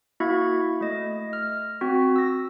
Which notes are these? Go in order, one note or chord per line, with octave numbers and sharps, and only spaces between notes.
A#3 E4 F#4 E5 G#6
A3 D#5
F6
C4 F#4
E6 A#6